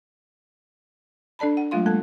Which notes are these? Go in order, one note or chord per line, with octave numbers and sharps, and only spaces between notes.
D4 A4 D5 A5 B5
F#5
F#3 G#3 A3 F4 F5 C6
G#3 A#3 A4 A5